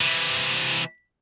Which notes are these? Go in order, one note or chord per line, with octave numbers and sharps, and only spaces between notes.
C3 E3